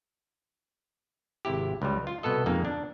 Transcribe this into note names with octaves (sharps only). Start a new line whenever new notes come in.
G#1 C3 E4 G4
C#2 G3
F4
C2 B2 B3 A4 D#5
F2 G#3 A#3 D#4
D4